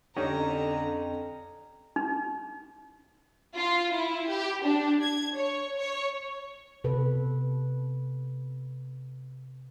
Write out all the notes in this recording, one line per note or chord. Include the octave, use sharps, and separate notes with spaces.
F2 D3 C#4 D#4 G4 A#5
D#4
F4
E4
G4
D4
G#6
C#5
C#5
C3 A4 B4